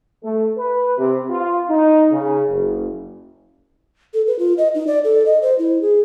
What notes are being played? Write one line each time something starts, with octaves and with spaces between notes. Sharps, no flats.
A3
B4
C3
F4
D#4
C#3
F#1
A4
B4
F4
D#5
D#4
D5
A4
D#5
C5
E4
G#4